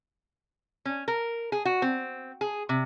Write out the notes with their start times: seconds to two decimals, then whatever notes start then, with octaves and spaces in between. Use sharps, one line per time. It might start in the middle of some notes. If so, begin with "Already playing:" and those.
0.85 C#4
1.08 A#4
1.52 G#4
1.65 F#4
1.82 C4
2.41 G#4
2.69 C3